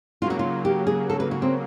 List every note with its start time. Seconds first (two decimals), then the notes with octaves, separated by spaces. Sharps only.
0.21 C#3 F#3 A#3 F4
0.30 F#4
0.39 F4
0.65 G4
0.87 G#4
1.10 A4
1.20 B4
1.31 F#4
1.42 C4